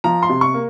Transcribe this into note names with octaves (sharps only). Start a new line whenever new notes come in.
F3 A#5
C6
C3
C#6
A#3